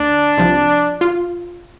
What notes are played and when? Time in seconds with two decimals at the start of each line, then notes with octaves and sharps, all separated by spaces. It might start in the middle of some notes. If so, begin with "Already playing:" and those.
Already playing: D2 D3 D4
0.38 C2 C3 F3
1.01 F4